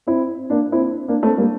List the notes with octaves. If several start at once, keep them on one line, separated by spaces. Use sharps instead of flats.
C4 E4
A#3 D4
C4 E4
A#3 D4
A3 C4
G3 A#3